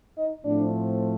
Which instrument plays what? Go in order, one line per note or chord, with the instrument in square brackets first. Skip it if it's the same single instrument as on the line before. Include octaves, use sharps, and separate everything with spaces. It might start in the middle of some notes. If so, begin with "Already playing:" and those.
[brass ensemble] D#4 D#5
A2 F3 A3 C4 D4 D5